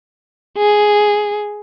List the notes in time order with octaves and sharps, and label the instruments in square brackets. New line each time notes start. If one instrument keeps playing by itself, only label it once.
[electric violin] G#4